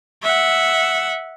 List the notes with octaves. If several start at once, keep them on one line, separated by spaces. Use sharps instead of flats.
E5 F#5